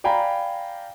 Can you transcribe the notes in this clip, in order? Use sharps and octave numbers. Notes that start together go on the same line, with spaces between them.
D5 F5 G5 G#5 A#5 B5